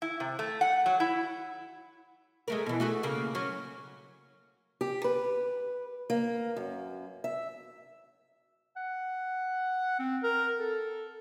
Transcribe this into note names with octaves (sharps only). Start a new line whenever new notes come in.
E4
C3
A3
F#5
F#3
E4
G#3 A3 A#4
B2 E3
A3 F#4 G#4
C#3 A#3
F#3 C#4
G4
B4
A#3
F#2
E5
F#5
C4
A#4
A4